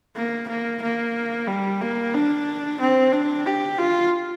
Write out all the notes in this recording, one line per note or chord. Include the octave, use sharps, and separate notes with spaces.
A#3
A#3
A#3
G3
A#3
D4
C4
D4
G4
F4